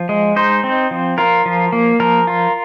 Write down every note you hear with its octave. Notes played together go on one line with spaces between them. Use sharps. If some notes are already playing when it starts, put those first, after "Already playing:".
Already playing: F3
G#3
D#4 C5
C4
F3
F4 A#4
F3
A#3
F3 A#4
F4